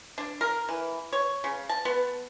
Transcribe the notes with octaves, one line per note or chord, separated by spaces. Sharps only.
D4
A#4
E3
C#5
C#3
A5
B3